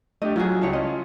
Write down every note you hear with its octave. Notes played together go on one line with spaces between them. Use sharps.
A3 D4 G4 D#5
F#3 F4 F#4 G#4
C#2 E4 C#5 A5
C#4 F4 D#5